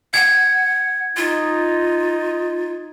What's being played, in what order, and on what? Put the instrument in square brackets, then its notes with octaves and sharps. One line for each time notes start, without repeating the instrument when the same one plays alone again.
[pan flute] F#5 [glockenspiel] G#6
[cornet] D#4 [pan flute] F4